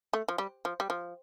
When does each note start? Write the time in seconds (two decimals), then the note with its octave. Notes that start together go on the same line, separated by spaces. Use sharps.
0.13 A3
0.28 F3
0.38 G3
0.65 F3
0.80 G3
0.90 F3